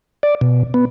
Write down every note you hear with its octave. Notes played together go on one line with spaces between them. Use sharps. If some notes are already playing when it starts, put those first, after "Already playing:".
D5
B2
B3